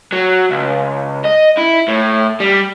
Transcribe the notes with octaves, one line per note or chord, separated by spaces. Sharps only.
F#3
C#2
D#5
E4
A2
G3